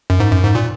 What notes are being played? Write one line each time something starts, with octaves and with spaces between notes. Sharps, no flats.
F#2
G#2
F#2
G#2
A#2